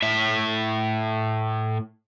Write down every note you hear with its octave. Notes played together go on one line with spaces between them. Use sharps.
A2 E5